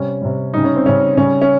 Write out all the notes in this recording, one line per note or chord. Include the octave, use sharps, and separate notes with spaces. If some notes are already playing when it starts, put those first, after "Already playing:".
Already playing: C3 G3 C#4
C3 G3
C#3 G3 D#4
C#4
C4
C#3 G3 C#4
C#3 G3 C#4
C#4